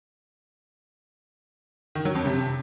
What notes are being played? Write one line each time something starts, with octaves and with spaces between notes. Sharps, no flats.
D#3
F#3
F2
C3